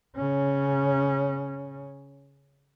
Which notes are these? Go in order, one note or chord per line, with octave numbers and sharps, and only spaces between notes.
C#3 C#4